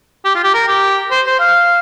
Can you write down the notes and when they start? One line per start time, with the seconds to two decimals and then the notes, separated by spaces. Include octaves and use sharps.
0.25 G4
0.35 F4
0.44 G4
0.54 A#4
0.68 G4
1.11 C5
1.26 C5
1.40 F5